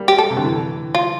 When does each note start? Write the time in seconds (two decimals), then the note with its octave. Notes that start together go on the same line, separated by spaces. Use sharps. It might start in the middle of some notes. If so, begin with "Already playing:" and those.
Already playing: G3 A#3
0.08 G4
0.19 A4
0.30 C3
0.37 D3
0.44 E3
0.95 F4